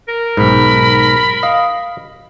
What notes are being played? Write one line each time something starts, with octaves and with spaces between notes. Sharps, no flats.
A#4
B1 G#2 B5
D#5 F5